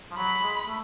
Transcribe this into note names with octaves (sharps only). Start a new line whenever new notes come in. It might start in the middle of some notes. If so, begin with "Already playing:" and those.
F3
F#3 B5
G#3
A3